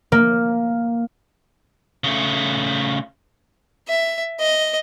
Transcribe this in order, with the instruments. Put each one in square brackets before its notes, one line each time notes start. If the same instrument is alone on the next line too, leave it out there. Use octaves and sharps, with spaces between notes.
[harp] A#3
[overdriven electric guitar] C#3 A3
[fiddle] E5
D#5